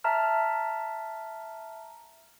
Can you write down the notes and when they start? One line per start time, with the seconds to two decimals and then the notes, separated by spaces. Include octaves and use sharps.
0.04 E5 A5 A#5 F6